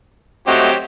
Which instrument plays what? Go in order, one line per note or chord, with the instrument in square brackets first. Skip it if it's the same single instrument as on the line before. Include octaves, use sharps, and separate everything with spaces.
[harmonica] F#3 C4 G4 [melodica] A3 D#5 F#5